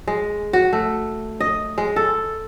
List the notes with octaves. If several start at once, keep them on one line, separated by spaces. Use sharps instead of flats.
G#3
F#4
A3
D#5
G#3
A4